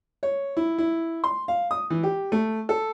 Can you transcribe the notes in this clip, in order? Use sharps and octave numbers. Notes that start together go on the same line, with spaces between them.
C#5
E4
E4
C6
F5
D#6
E3
G4
A3
A4